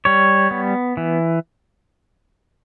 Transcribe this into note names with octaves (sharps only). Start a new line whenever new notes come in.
G3 C#5
B3
E3